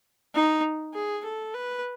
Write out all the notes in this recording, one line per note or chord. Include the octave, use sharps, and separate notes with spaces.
D#4
G#4
A4
B4